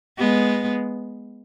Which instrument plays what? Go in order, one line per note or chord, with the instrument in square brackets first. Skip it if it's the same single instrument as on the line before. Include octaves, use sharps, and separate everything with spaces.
[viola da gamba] G#3 B3